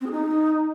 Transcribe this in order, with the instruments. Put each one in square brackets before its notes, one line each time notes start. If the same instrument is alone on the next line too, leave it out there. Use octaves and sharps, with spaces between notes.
[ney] C4
G#4
D#4